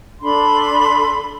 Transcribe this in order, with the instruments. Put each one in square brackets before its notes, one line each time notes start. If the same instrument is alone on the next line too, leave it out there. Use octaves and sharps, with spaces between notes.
[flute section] D4 A4 B5 C6